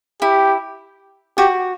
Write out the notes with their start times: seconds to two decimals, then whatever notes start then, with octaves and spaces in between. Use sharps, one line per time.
0.22 E4 G4
1.37 F#4 G4